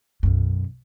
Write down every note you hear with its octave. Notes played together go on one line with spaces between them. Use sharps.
B1 F#2